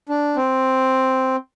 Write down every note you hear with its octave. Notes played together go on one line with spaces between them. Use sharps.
D4
C4